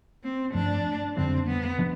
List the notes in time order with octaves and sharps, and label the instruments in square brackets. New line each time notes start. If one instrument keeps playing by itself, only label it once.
[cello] C4
[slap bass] G2 F3 A3 [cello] D4
[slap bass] F2 D3 G3 D4 [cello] C4
[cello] B3
[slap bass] F3 B3 D4